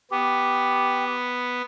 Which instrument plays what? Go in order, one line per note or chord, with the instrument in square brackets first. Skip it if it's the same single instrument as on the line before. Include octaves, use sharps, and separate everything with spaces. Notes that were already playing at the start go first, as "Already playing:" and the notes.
[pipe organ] B3 [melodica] G4